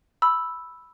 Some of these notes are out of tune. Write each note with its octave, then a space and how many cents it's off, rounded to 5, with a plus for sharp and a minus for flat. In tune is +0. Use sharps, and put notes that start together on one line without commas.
B5 +0 E6 +0